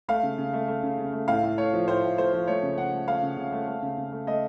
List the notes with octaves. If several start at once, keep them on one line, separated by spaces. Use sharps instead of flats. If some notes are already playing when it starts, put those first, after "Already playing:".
A3 F5
C#3
C#3
A3
A3
C#3
C#3
A3
A2 F5
A2
A3 C#5
F3
A2 C5
A2
A3 C5
F3
A3 C#5
C#3
C#3 F#5
A3
A3 F5
C#3
C#3
A3
A3
C#3
C#3
A3
A3 D#5